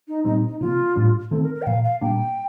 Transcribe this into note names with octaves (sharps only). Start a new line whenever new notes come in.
D#4
A#2 G3 C4 D#4
D#4
C3 F3 A#3 F4
A2 G3 D4
D#3 A3 C4 A4
A#4
A#4
G5
A#2 F3 A#3 F5
F5
A#2 G3 A#3 D4 G5